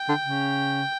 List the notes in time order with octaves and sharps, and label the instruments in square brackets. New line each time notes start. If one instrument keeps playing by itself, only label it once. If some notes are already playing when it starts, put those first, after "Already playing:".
Already playing: [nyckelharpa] G5
[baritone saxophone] D3
C#3